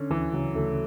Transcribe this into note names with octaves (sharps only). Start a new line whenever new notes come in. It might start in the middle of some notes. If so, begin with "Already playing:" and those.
Already playing: D3 C#4
D2 E3
C#3 F#3
D2 A3